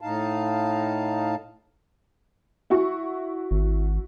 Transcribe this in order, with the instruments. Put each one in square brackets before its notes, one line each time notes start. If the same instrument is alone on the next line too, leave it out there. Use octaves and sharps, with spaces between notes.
[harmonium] A2 D#4 F5 A5
[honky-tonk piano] E4 F#4 C#6
[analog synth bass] G#1